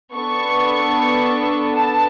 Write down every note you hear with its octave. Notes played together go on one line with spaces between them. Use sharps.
B3 D4 A4 C#6
A5